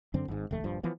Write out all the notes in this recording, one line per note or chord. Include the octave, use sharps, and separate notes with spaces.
F#2 D3 C4
G#1 G#2
F1 D#2 A3
D#1 G2 F3
E3 F3 B3